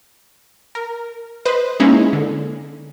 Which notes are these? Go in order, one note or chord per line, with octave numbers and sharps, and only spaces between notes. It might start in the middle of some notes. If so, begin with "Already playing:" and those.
A#4
B4 C5 D#5
G#3 A#3 C#4 D#4 E4 G#4
D3